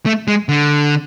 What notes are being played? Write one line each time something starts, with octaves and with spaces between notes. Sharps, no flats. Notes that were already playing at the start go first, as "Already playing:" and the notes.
A3
G#3
D3